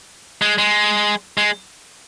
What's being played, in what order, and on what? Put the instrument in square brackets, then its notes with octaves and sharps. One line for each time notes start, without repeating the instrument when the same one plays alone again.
[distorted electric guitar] G#3
G#3
G#3